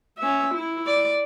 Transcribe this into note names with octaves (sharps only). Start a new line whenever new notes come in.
C#4 E5
E4
D5